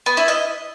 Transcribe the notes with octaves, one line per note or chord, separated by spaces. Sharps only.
B3
E4
D#5